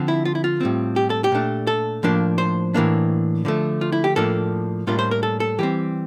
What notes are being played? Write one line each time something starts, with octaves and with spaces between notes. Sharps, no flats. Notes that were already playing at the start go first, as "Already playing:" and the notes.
Already playing: D3 F3 C4
E4
F4
E4
F4
A2 G3 C4
G4
A4
G4
A#2 A3 D4
A4
A2 F3 A#3 D4
C5
A2 E3 A#3 D4
D3 F3 A3
F4
E4
G4
A2 F3 A#3 D4 A4
A2 G3 A#3 D4 F4
C5
A#4
A4
A4
E3 G3 C4 G4